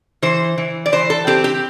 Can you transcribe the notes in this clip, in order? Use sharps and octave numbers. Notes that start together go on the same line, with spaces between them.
E3 C5
E3
D5
E3 C5
A4
C4 G4
G4